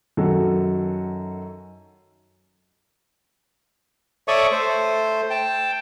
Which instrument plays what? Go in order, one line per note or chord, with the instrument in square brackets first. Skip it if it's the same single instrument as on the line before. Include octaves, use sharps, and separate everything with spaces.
[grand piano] F#2 D#3 F#4 A4
[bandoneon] A4 C#5 D5 E5 C#6 D#6
A3 C5
G5 A5